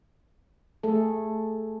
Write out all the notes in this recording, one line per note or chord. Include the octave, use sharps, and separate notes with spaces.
A3 G#4 A4